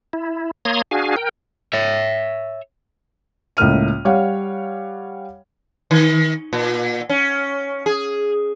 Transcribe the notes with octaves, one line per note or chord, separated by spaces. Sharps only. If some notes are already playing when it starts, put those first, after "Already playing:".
E4
A#3 C#5 A#5 C6 D#6 G#6
D4 F#4 G#4 F5 G#5
A#4 G5
C#5 E5
C#2 A2 A#3 F6 D#7
G3 C#5 F5 F#5
D#3
A#2
C#4
G#4